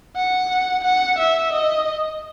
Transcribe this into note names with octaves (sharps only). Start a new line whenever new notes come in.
F#5
F#5
E5
D#5